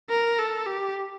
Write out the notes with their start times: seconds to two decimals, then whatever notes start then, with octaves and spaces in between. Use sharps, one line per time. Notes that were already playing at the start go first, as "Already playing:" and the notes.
0.10 A#4
0.38 A4
0.66 G4